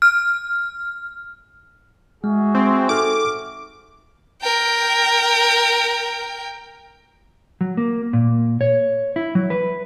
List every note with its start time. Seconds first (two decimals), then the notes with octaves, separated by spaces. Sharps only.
0.02 F6
2.24 G#3 F#4 G#4 E5
2.55 C4
2.89 D#4 A4 D6 F6
4.42 A#4 G5
7.61 F#3
7.77 A#3
8.13 A#2
8.61 C#5
9.16 E4
9.35 F#3
9.50 B4